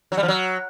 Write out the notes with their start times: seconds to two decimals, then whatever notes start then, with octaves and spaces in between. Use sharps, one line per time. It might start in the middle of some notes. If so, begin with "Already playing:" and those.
0.12 F#3
0.17 G3
0.23 F3
0.28 F#3